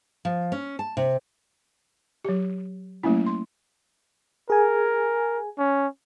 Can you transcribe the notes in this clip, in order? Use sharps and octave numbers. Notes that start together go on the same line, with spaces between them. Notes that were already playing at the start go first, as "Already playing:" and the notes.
F3
C#4
A5
C3
F#3 G4
F#3 A3 A#3 C#4 E4
C6
G#4 A#4 G#5
C#4